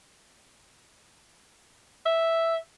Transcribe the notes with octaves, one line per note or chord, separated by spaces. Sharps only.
E5